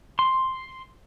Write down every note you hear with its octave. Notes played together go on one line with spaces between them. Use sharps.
C6